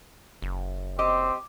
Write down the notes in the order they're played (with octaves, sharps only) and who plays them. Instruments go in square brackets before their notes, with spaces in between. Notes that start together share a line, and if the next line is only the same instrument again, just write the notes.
[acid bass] F#1
[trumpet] C4 [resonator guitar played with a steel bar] G4 D#5 [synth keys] D6